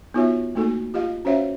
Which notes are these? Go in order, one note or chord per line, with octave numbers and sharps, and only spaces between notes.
B3 D#4 F4 F#4 C#5 E5
A3 A#3 D#4 F#4 A4
F4 G4 D#5 F5
C#4 F#4 C5 C#5 E5 F5